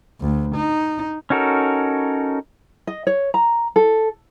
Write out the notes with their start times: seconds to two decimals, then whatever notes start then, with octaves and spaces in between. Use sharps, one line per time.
0.21 D2
0.55 D#4
1.30 C#4 D#4 F#4 A4 A#4
2.87 D#5
3.07 C#5
3.34 A#5
3.76 A4